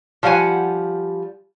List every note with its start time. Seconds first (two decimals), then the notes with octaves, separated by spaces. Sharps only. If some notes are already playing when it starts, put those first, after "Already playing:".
0.23 F3 G3 F5 F#5 G#5